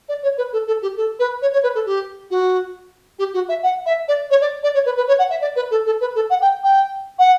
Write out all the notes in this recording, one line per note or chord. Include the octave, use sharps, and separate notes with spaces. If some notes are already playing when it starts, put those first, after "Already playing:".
D5
C#5
B4
A4
A4
G4
A4
B4
C#5
C#5
B4
A4
G4
F#4
G4
F#4
E5
F#5
E5
D5
C#5
D5
D5
C#5
B4
B4
C#5
F#5
E5
D5
B4
A4
A4
B4
A4
F#5
G5
G5
F#5